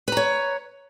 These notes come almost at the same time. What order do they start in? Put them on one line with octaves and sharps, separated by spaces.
B4 A#5 C#5